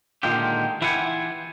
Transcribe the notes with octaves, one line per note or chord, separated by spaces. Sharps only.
A#2 D3 D#3 G#3 F4 G4
E3 E4 F4 G4 F#5 G#5